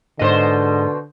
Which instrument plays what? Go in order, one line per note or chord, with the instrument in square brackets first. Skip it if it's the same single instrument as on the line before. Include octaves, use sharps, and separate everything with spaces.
[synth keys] G#2 D#5 [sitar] B2 B4 C5 [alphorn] D3